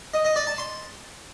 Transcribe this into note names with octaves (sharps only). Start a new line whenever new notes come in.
D#5
D#5
D5
A5
C6